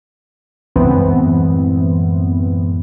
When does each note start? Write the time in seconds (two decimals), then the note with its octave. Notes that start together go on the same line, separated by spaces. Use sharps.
0.76 C#2 G2 E3 B3 C4
0.93 F#2 A2 G#3